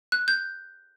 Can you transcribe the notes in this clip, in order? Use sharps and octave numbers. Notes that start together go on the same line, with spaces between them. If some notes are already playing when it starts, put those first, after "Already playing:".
F#6
G6